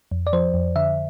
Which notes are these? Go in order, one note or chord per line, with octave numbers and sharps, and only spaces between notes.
F2
D5
F3 C5
F2
D3 E5